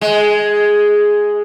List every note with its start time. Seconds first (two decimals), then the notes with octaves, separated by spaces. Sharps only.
0.01 G#3